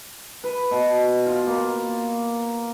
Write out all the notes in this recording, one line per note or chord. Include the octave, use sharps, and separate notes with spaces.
B4
B2
F4
A#3